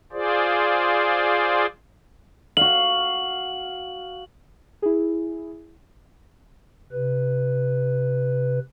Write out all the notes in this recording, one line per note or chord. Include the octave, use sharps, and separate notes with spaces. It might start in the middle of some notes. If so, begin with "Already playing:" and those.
F4 G#4 C5 D5
F#4 F5 F#7
E4 G#4
C3 B4